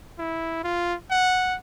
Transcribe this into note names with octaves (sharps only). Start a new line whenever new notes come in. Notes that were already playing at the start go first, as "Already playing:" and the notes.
E4
F4
F#5